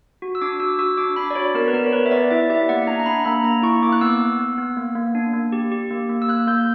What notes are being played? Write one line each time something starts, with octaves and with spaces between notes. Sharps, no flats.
F#4
E6
D4 D6
F#4 E6
F#4 E6
D4 D6
D4 B5
D5
F#4 C#5
B3 A#4
B4
B3 A#4
C#5
B3 B4
E5
B3 D5
E4 E5
G4 E5
A#3 F#5
D4 A#5
A#5
D4 B5
B5
A#3 A#5
A#3 A#5
E4 C#6
A#3 D6
F#6
B3 E6
B3
B3
B3
A#3
A#3
D4
A#3
G4
G4
A#3
A#3
E6
A#3 F#6
A#3 G6